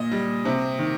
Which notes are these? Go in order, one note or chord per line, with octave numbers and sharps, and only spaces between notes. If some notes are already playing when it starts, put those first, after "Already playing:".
Already playing: A#2 D#5
G3
C3
D#3